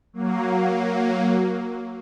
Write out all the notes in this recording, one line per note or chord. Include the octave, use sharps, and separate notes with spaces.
F#3 A#3